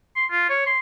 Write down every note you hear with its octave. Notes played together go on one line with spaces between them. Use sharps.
C6
F4
C#5
C6